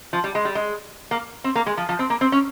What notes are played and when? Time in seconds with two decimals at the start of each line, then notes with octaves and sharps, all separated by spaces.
0.13 F3
0.24 G3
0.35 G#3
0.45 G3
0.55 G#3
1.11 A#3
1.44 C4
1.55 A#3
1.66 G#3
1.77 F3
1.89 F3
1.99 C4
2.10 A#3
2.21 C4
2.32 C#4